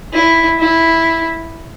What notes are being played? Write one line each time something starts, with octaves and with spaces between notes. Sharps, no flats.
E4
E4